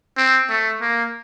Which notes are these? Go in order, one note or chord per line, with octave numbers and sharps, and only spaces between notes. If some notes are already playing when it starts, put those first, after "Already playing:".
C4
A3
A#3